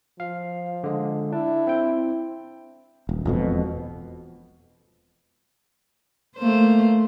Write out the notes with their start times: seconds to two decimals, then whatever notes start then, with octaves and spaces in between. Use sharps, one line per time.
0.20 F3 F5
0.84 D3 G#3
1.33 D4 E4
1.67 C4 G5
3.09 D#1
3.25 E1 F2 B2
6.37 A3 A#3 C5